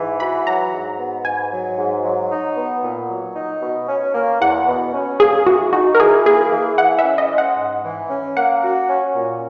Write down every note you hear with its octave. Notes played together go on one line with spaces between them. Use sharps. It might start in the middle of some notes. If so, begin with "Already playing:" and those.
Already playing: G#2 E3
F#4 B5
F#3 A#5
G#2
B3
G#2 G#5
F#3
G#2
F#3
D#4
B3
A#2
F#3
D#4
B2
C#4
A#3
E2 F#5
B2
C#4
A#3 G#4
E3 F#4
D#4 F#4
A#4
E3 G#4
A#3 G#4
E3
E3 F#5
E5
C#4
D#5
G#3
F#5
G#2
E3
C#4
A#3 F#5
F#4
C#4
A#2